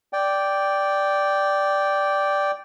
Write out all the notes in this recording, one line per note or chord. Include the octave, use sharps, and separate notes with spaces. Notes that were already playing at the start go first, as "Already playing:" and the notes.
D5 G5